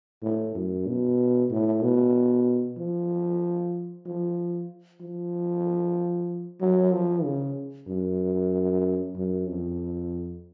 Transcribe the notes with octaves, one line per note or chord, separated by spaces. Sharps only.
A2
F#2
B2
A2
B2
F3
F3
F3
F#3
F3
C#3
F#2
F#2
F2